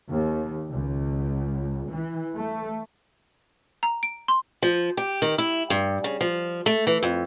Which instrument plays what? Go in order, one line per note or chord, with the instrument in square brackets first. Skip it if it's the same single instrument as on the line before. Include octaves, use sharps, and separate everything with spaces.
[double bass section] D#2
C#2
E3
A3
[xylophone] A#5
D7
C6
[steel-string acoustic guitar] F3
G4
D#3
E4
G2
C#3
F3
A3
E3
F2